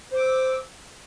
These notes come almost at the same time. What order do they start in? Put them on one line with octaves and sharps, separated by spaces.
C5 D6 E6